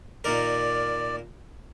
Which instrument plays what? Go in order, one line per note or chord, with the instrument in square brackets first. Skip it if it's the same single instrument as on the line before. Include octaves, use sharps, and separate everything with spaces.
[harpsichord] A#2 D#3 A#4 [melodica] D5